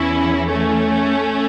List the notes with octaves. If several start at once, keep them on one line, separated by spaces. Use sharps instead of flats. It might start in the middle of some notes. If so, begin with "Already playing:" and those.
Already playing: E2 E3 C#4 E4
A3 C#4